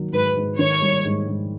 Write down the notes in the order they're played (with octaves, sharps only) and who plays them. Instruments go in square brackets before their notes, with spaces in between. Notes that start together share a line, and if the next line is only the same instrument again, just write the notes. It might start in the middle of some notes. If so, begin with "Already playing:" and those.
Already playing: [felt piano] D#3 F#3
[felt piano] G#2 [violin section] B4
[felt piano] G#2
[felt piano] D#3 [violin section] C#5
[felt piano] G3
G#2
G#2